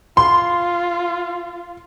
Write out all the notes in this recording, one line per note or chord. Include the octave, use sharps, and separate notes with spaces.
F4 C6